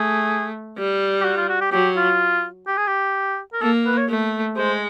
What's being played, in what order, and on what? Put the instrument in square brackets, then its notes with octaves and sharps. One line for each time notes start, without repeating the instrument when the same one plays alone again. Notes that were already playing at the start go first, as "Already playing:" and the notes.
Already playing: [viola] A3 [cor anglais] G#4
[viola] G3
[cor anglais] G4
F#4
F4
F#4
G4
[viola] F#3 [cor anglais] G4
[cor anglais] F4
G4
G#4
G4
A#4
[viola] A#3 [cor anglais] A4
[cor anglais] B4
C#5
[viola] A3
[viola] G#3 [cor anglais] C5